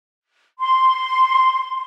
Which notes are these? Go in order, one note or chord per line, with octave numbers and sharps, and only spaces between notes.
C6